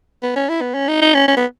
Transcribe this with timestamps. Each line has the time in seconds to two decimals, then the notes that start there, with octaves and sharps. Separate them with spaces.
0.23 B3
0.36 C#4
0.49 E4
0.61 B3
0.74 C#4
0.88 D#4
1.02 D#4
1.14 C#4
1.28 C#4
1.37 B3